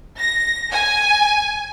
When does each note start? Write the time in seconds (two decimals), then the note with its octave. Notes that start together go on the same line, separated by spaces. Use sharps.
0.19 A#6
0.71 G#5